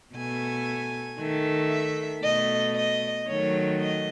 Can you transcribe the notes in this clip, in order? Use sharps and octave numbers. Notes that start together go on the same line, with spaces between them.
B2 A3 G#5
D#3 A3
E5
B2 A3 D#5
D#5
D#3 F#3 A3 C#5
D#5